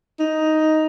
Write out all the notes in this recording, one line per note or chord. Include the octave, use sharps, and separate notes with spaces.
D#4